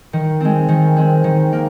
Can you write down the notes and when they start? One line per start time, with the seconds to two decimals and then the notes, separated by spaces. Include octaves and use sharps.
0.13 D#3
0.41 G#3 C4
0.69 D#3
0.96 G#3 C4
1.24 D#3
1.53 A#3